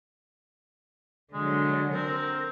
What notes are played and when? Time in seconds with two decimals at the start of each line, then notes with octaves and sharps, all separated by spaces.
1.33 D3 F#3 G#3
1.94 C4 A#4